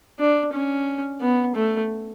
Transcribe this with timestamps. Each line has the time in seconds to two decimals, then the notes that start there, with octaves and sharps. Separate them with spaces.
0.20 D4
0.53 C#4
1.21 B3
1.55 A3